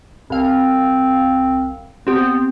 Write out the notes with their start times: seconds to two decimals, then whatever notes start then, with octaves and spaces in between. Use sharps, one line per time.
0.30 C2 C4 F5
2.07 B3 C4 G4